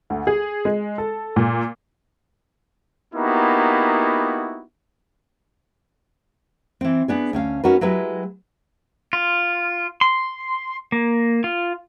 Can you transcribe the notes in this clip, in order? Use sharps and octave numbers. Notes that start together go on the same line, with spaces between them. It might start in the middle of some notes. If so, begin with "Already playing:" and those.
D2
G#4
G#3
A4
A#2
A#3 B3 D#4 E4 F#4 G4
E3 C4
B3 D4 G#4
D2 C#4 F5
C#4 D#4 F#4 A#4 B4
F#3 G#3 E4 G4 B4
F4
C6
A#3
F4